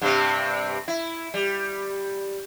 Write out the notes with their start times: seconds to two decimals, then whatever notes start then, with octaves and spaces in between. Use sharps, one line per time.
0.02 G2 C3 C4
0.88 E4
1.34 G3